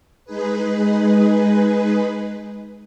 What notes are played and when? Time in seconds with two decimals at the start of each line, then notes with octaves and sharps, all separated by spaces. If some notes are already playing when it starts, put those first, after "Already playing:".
0.25 G#3 D#4 G#4 B4